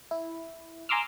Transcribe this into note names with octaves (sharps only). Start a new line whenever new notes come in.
E4
G#5 A#5 C6 D6 E6 F6